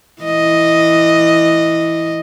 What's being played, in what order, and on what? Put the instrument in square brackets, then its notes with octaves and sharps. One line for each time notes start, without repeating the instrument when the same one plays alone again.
[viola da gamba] E3 D#5